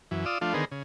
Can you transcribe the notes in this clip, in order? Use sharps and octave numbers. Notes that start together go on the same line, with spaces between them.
F#2 E3
F4 D5 D#6 E6
F3 A3 D4 F4
D3 D#3 B3 G#4 A#4 C5
C#3